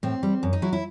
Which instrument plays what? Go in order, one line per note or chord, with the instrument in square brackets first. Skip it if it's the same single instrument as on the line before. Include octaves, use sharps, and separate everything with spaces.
[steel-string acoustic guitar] A2 C4
G3
F#2
D#4
F#3 E4
E4